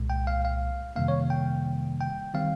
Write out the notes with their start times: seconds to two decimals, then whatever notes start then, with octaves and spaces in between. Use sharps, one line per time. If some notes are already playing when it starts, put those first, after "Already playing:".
Already playing: C2 A#2 G#3
0.10 G5
0.27 F5
0.45 F5
0.96 F2 C3 D#3 G3 A#3 F5
1.08 C#5
1.30 G5
2.01 G5
2.34 D#3 G3 C4 F5